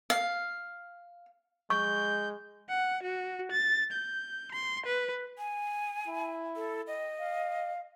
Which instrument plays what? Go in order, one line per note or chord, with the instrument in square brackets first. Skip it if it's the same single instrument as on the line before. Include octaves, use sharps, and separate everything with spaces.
[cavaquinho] F5
[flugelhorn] G#3 [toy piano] C#6 [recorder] G6
[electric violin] F#5
F#4
A6
G6
C6
B4
[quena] G#5
[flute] E4
[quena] A4
[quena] D#5 [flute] G5
[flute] F5